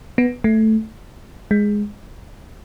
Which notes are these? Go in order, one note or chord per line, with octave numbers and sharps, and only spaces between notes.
B3
A3
G#3